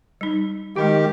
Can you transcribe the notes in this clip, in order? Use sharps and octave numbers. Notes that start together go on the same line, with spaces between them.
G3 D#4
D#3 G#3 D#4 F#4 G4